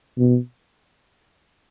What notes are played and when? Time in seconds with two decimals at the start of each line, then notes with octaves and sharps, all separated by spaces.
0.18 B2